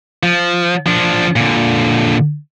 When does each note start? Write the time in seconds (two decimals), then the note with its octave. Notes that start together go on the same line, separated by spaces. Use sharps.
0.23 F3
0.86 F3 D4
1.36 A#2 D3